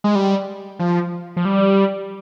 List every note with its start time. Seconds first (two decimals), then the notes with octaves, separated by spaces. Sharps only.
0.04 G#3
0.15 G3
0.79 F3
1.37 F3
1.45 G3